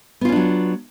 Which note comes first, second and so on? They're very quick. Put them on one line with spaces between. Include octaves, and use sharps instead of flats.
B3 F4 C#4 D4 F#3